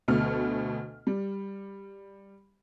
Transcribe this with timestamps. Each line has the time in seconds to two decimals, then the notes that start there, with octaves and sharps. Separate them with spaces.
0.08 D2 B2 A3 F6
1.07 G3